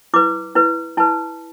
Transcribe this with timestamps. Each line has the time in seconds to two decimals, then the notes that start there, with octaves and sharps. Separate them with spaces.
0.14 E4 B4 D6
0.55 E4 B4
0.97 E4 B4 A5